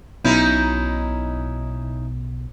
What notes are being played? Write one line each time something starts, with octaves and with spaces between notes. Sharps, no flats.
B1 B2 C#4 D#4 E4